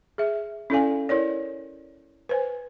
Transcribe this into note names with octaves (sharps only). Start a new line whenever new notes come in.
G#4 E5
C#4 E4 A4 D5 F5 G#5
E4 A#4 C#5 D5
B4 C5 G#5